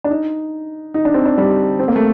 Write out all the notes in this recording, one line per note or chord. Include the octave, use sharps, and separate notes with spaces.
D4
D#4
D#4
D4
C4
D4
G3
C4
A#3
A3